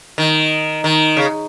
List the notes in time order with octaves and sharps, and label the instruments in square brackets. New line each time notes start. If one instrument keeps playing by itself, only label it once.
[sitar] D#3
D#3
C#3